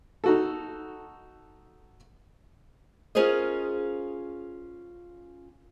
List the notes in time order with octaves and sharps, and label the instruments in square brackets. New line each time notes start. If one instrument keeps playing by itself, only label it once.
[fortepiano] D#4 F#4 A4
[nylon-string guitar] C#4 F4 G#4 A#4 C5 D#5